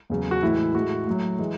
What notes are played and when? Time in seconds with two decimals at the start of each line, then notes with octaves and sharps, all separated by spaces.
0.10 E2 C#3 F#3
0.31 F#4
0.42 A2 E3 G#3 E4
0.75 A2 G#3 F#4
1.07 A2 F#3
1.39 E3 G#3